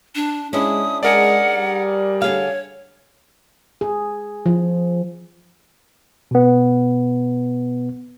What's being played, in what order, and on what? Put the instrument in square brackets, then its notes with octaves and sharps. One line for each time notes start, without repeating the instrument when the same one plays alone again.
[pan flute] D4
[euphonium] G#3 [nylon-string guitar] C#4 D4 E4 [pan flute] D#6
[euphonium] G#3 [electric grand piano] G#4 A#4 D5 [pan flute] F#5
[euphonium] G3
[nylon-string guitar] D3 G#4 F5 [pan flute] C#5
[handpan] G#4
F3
[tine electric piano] B2 B3